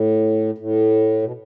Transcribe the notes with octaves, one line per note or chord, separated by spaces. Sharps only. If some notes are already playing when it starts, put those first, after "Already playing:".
Already playing: A2
A2
B2